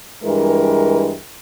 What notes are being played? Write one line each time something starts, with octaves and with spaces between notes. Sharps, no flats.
G2 E3 G#3 A#4